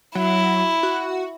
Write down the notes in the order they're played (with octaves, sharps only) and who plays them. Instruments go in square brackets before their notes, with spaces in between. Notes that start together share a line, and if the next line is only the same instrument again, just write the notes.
[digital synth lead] F#3 [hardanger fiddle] E4
[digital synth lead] F#4